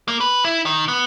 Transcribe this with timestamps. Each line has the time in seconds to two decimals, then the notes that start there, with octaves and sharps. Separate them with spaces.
0.08 A#3
0.20 B4
0.45 E4
0.66 D#3
0.88 B3